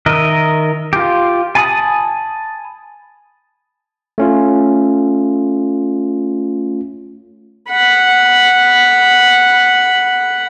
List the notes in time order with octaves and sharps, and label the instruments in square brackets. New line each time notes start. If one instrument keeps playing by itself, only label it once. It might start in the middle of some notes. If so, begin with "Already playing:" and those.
[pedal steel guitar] D#3 A#4 D#5 E5
F4 G4
G#5 A5 B5 C#6 D#6
[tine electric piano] A3 C#4 F4
[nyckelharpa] F#5 B5